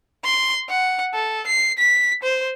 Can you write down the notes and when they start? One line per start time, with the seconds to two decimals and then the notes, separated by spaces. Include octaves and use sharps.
0.24 C6
0.69 F#5
1.14 A4
1.46 C7
1.78 B6
2.23 C5